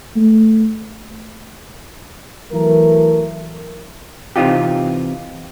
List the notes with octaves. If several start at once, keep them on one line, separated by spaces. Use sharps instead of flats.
A3
E3 F#3 A3 A#4
C3 E3 C4 D#4 F4 G4